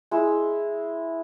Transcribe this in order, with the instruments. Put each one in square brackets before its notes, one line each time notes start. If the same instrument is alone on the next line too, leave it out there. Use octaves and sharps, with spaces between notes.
[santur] G#3 E4 E6